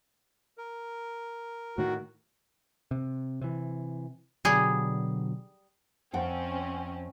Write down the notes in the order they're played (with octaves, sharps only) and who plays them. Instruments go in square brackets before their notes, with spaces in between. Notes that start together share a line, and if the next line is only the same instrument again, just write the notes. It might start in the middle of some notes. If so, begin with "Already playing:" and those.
[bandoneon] A#4
[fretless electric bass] A2 D#3 [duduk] F#4
[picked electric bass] C3
C3 E3
[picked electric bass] B2 D3 F#3 [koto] G3 G#4
[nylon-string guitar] F2 F#5 G5 [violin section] C4 C#4